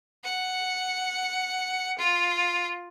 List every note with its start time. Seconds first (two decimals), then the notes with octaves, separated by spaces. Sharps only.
0.24 F#5
1.98 F4